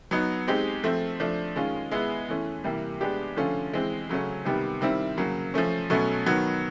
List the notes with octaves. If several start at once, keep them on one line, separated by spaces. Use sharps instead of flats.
F#3 B3 D#4
G#3 C4 D#4 G4
F3 A3 C4
F3 A3 D4
D#3 G#3 C#4 F4
G#3 B3 E4
E3 A3 C#4
C3 E3 G3 A#3
G#3 B3 D4 G4
D3 F3 A3 C#4 F4
E3 G#3 C4
C#3 F#3 A3 C#4
C3 D#3 G3 B3
D#3 G3 C4 E4
C#3 F#3 A#3
F3 A3 C#4
B2 F#3 A3 C#4
D#3 F#3 B3